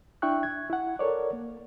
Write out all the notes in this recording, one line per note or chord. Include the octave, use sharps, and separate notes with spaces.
D4 E4 E5 G5 C#6 F#6
G#6
E4 F#5
A4 A#4 C#5 D5
A#3